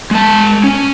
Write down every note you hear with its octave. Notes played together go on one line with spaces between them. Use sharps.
G#3 A5
C#4